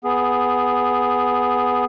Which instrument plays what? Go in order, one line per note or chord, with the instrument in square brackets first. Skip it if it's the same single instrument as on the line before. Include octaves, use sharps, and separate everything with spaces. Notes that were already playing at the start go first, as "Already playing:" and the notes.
[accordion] B3 G#4